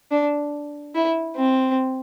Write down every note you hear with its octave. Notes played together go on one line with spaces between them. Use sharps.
D4
E4
C4